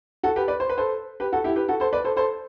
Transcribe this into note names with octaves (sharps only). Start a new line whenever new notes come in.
F#4 A4
G4 B4
B4 D5
C5
B4
A4 C5
G4 B4
F#4 A4
E4 G4
G4 B4
F#4 A4
A4 C5
B4 D5
A4 C5
A4 C5